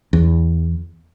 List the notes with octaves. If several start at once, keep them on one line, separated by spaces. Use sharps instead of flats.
E2